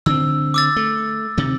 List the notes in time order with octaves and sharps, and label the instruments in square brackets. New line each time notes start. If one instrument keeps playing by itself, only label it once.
[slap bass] D3 C4 [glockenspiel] E6
[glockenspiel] D6 E6 A6
[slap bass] A3
C3 D#3